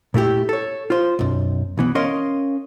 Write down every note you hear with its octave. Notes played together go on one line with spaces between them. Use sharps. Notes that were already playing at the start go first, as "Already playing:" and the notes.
A#2 A3 E4 G4
A4 C#5
F4 C5
B1 F#2
B1 E3 B3
C#4 A#4 C#5 D#5 F5 C6